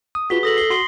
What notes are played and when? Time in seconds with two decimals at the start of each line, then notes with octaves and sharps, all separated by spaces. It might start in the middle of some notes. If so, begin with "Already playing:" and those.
0.15 D#6
0.30 F4 F#4 G#4 B4 B6 G7
0.43 A4 D#6 A#6 F#7
0.57 C7 G7
0.70 F#4 C6 C7 G7